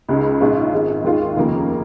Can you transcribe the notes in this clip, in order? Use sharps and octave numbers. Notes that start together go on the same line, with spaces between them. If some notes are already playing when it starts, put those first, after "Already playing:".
C#2 C#3 G#3 D#4
A#1 G#2 G#3 C#4 F4
G#1 G#2 G#3
D#2 D#3 G#3 F4
F1 D#2 C#3 F3 A#3